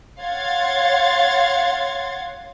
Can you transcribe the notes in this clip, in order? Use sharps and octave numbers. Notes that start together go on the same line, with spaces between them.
C#5 F5 F#5 C6 G#6 A6